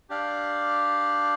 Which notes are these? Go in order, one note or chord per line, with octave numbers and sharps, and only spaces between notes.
D4 G4 D5 F5